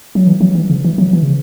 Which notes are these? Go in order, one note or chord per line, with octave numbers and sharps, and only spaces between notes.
F#3
E3
F#3
E3
C#3
E3
F#3
E3
C#3